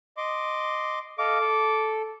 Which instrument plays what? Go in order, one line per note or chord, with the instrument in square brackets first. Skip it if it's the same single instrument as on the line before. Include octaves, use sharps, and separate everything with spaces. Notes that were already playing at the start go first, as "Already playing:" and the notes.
[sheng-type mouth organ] D#5 C6 D6
[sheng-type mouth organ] A4 D#5 F5 [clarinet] D6
[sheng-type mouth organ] A4